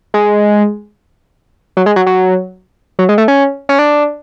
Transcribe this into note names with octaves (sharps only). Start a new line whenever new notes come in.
G#3
F#3
G#3
F#3
F#3
F#3
G#3
A3
C#4
C#4
D4